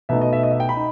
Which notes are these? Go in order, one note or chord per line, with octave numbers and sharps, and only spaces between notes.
B2 A3 D#4 E5
D#5
E5
D#5
E5
G5
B5
D#4